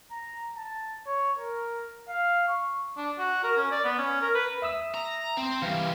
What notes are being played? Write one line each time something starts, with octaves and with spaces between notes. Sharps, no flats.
A#5
A5
C#5
A#4
F5
C#6
D4
F#4
A#4
C#4
D5
B3
C#4
A#4
B4
E5 D#6 E6
A#5
C4
E3 G3 F5